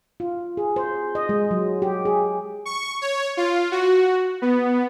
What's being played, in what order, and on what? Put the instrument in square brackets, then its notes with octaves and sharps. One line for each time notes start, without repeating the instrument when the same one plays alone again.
[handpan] F4
G#4
C5
D#5
G#3
F#3
G4
G#4
[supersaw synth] C#6
C#5
F4
F#4
B3